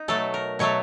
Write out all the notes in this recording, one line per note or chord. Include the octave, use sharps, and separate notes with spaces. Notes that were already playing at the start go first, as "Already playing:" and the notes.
Already playing: D#4
B2 F#3 A3 A4
A#4
B2 F#3 A3 C#5